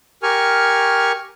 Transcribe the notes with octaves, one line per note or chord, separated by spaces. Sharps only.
G4 A#4 G#5 C#6 F6